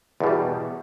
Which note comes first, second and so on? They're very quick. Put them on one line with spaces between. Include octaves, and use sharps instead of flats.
E2 B2 G3